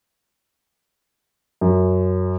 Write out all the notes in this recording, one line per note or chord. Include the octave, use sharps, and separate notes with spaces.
F#2